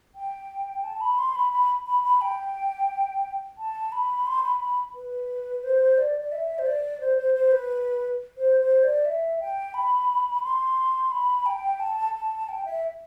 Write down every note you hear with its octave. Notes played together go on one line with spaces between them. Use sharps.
G5
A5
B5
C6
B5
B5
B5
B5
G5
A5
B5
C6
B5
B5
B4
C5
D5
D5
E5
C5
D5
C5
C5
C5
B4
C5
C5
D5
E5
G5
B5
C6
B5
G5
A5
A5
G5
E5